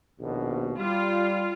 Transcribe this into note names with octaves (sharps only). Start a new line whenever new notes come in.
A#1 D#2 B2
G3 F4